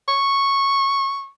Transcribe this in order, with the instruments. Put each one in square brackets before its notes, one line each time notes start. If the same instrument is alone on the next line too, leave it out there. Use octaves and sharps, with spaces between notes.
[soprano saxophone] C#6